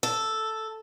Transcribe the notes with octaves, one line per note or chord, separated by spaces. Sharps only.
A4